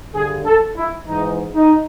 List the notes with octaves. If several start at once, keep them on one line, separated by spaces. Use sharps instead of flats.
G2 D3 G#4
A4
E4
G#2 E3 D#4
D#4